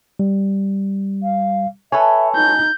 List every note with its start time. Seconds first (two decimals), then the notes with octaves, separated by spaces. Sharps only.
0.20 G3
1.23 F5
1.92 A4 B4 C#5 E5 G#5
2.36 D#4 G6